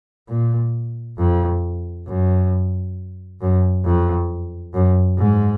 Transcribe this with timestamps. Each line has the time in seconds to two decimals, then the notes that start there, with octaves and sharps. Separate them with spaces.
0.29 A#2
1.18 F2
2.07 F#2
3.41 F#2
3.85 F2
4.74 F#2
5.18 G#2